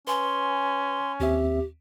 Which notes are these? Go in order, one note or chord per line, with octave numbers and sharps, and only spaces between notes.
C#4 B4 G#5 C6
D#2 C4 G4 E5